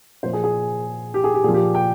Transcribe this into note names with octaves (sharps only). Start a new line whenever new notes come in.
A#2 F3 C5
G#4
G#4
G4
G#4
G4
A#2 F3 G#4
G4
G5